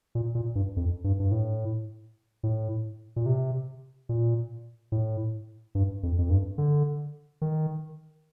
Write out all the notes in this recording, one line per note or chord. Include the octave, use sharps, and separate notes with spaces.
A#2
A#2
G2
F2
G2
G2
A2
A2
A#2
C3
A#2
A2
G2
F2
F2
G2
D3
D#3